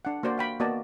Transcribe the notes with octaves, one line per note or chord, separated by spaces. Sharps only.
D4 F#5
A#3 F#4 C5 D5
F5 G5 B5
A#3 B3 F#4 D5 D#5 A5